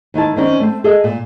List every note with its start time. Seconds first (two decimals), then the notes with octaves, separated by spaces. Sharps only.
0.14 D#2 D#3 E4 A5
0.36 D#3 C4 C#4 D5
0.60 A3 C4
0.84 G#4 A4 D#5 E5
1.04 A#2